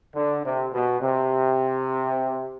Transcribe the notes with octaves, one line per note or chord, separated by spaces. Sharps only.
D3
C3
B2
C3